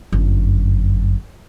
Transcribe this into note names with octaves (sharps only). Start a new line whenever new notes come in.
G1 F#2